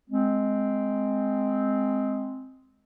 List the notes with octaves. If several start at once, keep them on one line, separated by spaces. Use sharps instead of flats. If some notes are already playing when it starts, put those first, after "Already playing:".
G#3 C4